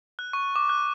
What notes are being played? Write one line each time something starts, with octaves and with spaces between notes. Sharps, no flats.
F#6
C#6
D6
F#6